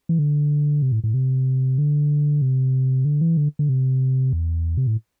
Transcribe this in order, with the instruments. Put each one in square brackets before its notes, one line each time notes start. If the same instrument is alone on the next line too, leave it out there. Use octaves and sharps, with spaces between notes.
[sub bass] E3
D3
C3
A2
A2
C3
D3
C3
D3
E3
D3
D3
C3
E2
C3
A2